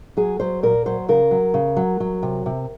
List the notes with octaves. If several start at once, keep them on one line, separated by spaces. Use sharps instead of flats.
F#3 G#4
F#3 C5
A#2 A#4
F#3 C5
C#3 A#4
F#3
C#3
F#3
F#3
C3
C3